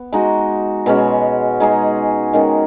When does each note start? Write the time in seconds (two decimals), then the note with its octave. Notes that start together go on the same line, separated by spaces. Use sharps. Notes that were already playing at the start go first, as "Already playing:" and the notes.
Already playing: B3
0.12 G#3 D#4 F#4
0.86 B2 G#3 C#4
1.60 G#3 D#4 G#4
2.33 D#3 G#3 C#4